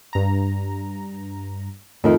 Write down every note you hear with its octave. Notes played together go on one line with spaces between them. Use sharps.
G2 A#5
F2 A2 D#3